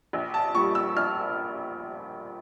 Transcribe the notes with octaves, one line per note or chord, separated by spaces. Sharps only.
A#1
A5
A#2 G3 C#6
E6
A#1 F6